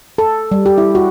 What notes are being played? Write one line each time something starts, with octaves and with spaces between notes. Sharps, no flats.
A4
G3
G4
E4
F#4